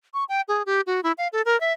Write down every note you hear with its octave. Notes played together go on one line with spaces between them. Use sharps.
C#6
G5
G#4
G4
F#4
E4
F5
A4
A#4
E5